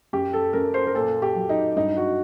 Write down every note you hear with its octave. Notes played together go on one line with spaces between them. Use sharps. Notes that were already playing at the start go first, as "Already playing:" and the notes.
F#2 G4
A4
F#2 A#4
C5
A#4
A#2 A4
G4
F#3
D#4
G2 D#4
F#4